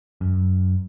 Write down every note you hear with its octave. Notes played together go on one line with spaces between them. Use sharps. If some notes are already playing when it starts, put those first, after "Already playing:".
F#2